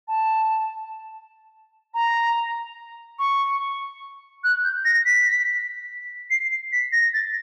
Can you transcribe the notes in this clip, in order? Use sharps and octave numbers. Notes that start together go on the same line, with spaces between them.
A5
A#5
C#6
F#6
G6
A#6
B6
C7
B6
A#6
A6